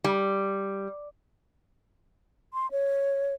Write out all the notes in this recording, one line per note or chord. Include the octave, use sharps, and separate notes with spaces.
G3
C6
C#5